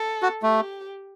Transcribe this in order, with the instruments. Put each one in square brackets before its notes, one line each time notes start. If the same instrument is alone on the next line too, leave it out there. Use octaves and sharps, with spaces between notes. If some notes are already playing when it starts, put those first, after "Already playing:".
Already playing: [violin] A4
[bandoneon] F#4
[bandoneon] A3 [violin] G4